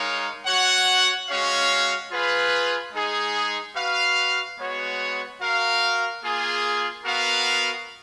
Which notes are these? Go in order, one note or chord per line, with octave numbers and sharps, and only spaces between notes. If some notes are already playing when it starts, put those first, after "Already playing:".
Already playing: G#3 D#4 A#4 C#5 F5
F#4 C#5 F#5
G#3 C#4 F#4 C#5 F5
F4 G#4 B4 F5
G#3 D#4 G#4
F#4 B4 F5
G#3 B3 F#4 C#5
F#4 A#4 F5
A#3 F4 G#4
B3 F#4 A#4 F5